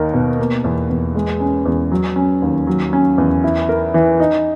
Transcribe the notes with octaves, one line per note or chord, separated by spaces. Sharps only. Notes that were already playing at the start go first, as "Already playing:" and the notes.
Already playing: D#2 D#4 A#4
B2
A#3
E2
E2
G#3
C#4
E2
F#3
C#4
D#2
F#3
C#4
E2
E4
A#4
E3
D#4